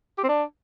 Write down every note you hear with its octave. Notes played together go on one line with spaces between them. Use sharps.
G4
C4
D4